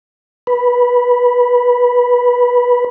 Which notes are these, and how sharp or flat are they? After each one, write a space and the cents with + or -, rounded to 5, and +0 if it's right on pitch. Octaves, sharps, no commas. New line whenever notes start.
B4 -15